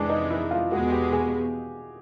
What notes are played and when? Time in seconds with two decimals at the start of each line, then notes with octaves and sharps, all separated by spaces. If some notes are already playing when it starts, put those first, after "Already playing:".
Already playing: F2 C3 E3 G#3 D4
0.10 D#4
0.30 E4
0.51 F4
0.72 E2 B2 G#3 F#4
0.92 G4
1.12 G#4